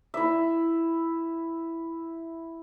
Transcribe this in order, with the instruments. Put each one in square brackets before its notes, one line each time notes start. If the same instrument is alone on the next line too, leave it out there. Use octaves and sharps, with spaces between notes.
[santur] E4 E5